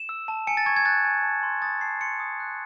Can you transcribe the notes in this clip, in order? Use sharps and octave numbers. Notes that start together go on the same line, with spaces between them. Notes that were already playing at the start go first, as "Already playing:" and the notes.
Already playing: E7
E6
A5
G#5 C#7
A6
C#6 G#6
G#6
F#6 A6
G#5
A5
C6
D#6 A6
A5 C7
C6 C#7
D#6
F#6